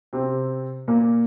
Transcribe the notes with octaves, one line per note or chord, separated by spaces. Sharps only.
C3 C4
A#2 A#3